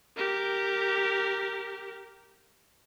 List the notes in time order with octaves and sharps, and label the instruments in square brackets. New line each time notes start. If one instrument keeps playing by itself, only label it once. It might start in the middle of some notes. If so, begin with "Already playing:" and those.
[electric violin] G4 A#4